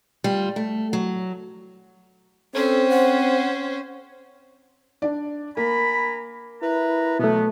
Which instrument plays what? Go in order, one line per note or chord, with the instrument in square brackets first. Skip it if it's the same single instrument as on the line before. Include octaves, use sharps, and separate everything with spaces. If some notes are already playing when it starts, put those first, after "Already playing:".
[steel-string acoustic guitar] G3 F4
A3
F#3
[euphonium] C4 [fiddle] C#4 C5 [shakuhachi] A4
[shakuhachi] F#5
[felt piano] D4 D5
[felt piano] A#3 [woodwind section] G#5 A#5 B5
[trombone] E4 [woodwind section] B4 A#5
[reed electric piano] B2 A3 [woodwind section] E3 F#3 B3